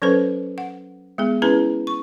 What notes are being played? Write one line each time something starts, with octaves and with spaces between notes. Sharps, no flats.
F#3 C#4 A4 B4 C5
F#5
G#3 B3 G#4
C#4 E4 G#4 B4 A#5
C#6